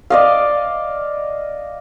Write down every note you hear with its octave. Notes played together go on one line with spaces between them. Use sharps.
D5 D#5 F5